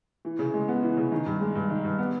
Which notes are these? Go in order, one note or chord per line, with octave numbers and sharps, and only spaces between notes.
E3
C#3
G#3
B3
E3
C#3
D#3
G2
G#3
G2
D#3
G2
B3